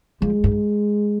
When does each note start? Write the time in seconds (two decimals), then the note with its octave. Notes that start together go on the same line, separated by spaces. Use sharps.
0.22 F3 G#3
0.44 G#2